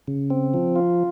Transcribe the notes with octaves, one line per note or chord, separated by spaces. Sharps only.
C#3
C4
F3
F4